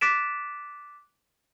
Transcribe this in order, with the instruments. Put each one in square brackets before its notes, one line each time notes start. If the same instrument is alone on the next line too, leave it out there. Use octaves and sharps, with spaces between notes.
[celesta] D6 F#6 A6 B6 D7 E7